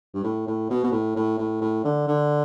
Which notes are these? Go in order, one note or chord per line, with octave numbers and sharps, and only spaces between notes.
G2
A2
A2
B2
B2
A2
A2
A2
A2
D3
D3